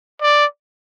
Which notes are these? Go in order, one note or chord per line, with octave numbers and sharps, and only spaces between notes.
D5